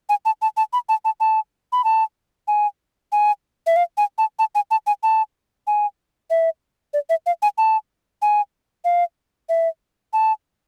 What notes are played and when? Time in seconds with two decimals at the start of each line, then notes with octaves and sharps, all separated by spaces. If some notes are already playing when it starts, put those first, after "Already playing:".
0.09 G#5
0.25 A5
0.42 A5
0.57 A5
0.73 B5
0.89 A5
1.05 A5
1.20 A5
1.72 B5
1.84 A5
2.48 G#5
3.12 G#5
3.67 E5
3.76 F5
3.98 G#5
4.18 A5
4.39 A5
4.55 G#5
4.71 A5
4.87 G#5
5.03 A5
5.67 G#5
6.30 E5
6.94 D5
7.10 E5
7.26 F5
7.42 G#5
7.58 A5
8.22 G#5
8.85 F5
9.49 E5
10.13 A5